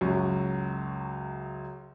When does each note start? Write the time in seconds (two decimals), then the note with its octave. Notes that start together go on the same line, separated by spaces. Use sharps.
0.01 C#2 F#2 F#3